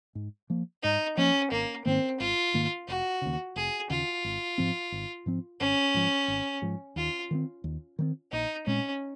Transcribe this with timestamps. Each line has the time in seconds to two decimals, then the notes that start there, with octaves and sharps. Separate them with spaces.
0.15 G#2
0.50 F3 A#3
0.83 G#2 D#4
1.17 F3 A#3 C#4
1.51 G#1 A#3
1.85 G#2 D#3 A#3 C4
2.20 G#1 F4
2.54 G#2 D#3 A#3
2.88 F1 F#4
3.22 D#2 C#3
3.56 F1 G#4
3.90 D#2 C#3 F4
4.24 G#1
4.58 G#2 F3 C4
4.92 G#1
5.26 G#2 F3 C4
5.60 G#1 C#4
5.94 G#2 F3
6.28 G#1
6.62 G#2 F3
6.96 D#2 F4
7.31 D#3 F#3 C4
7.64 D#2
7.99 D#3 F#3 C4
8.32 A#1 D#4
8.67 A#2 G#3 C4 C#4